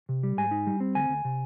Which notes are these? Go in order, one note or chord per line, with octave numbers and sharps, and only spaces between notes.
C3
G3
G#2 G#5
D#4
G3
C4
D2 G#5
D2
C3